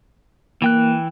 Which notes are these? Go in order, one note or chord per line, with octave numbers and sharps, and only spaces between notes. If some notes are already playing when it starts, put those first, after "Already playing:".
E3 A#3 G5 F#6